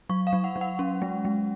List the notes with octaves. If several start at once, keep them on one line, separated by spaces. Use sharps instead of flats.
F#3 C#6
F5
F#3
F#5
F#3
F#5
C#4
G#3
G#3